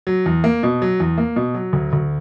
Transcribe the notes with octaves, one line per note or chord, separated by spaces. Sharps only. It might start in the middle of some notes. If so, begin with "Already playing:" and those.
F#3
E2
A#3
B2
F#3
E2
A#3
B2
F#3
D2
D2